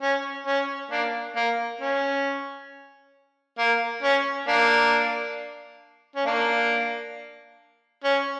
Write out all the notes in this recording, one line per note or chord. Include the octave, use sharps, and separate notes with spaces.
C#4
C#4
A#3 D4
A#3
C#4
A#3
C#4
A#3 D4
C#4
A#3 D4
C#4